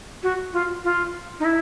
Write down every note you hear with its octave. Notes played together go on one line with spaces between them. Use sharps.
F#4
F4
F4
D#4
E4